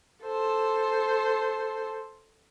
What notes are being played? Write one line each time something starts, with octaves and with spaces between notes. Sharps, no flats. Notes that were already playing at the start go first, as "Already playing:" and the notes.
A4 C5